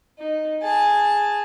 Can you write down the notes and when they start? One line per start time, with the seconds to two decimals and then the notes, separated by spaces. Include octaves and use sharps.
0.19 D#4
0.63 G#4 A5